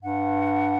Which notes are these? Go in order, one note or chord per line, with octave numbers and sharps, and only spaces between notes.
G2 F#5